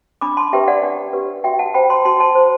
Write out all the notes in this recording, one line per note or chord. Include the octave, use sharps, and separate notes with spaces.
D4 B5 D6
A5 C6
G4 B4 E5 G5
D5 F#5
D4
G4 B4
F#4 E5 G5
F#5 A5
C5 G5 B5
A5 C6
F#4 A5 C6
A5 C6
C5